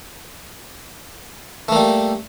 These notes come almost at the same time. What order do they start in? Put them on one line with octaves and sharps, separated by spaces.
A3 A#3 G3